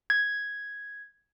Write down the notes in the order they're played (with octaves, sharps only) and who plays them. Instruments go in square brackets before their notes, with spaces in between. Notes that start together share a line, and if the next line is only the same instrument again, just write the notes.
[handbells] G#6